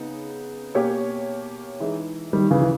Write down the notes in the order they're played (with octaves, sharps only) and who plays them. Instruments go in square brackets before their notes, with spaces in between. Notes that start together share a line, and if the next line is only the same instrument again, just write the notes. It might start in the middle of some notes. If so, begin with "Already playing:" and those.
Already playing: [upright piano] C#3 B3 D#4
B2 A#3 C#4 G4 C#5
E3 G#3 D#4
[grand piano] D#3 G3
C#3 E3
E3